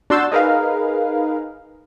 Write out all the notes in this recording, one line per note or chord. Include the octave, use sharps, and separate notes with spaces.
D4 F#4 C6 E6 G6 A6
D#4 G#4 A#4 B4 F5